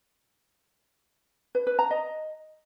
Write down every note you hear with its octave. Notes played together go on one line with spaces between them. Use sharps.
B4
B4
A#5
D#5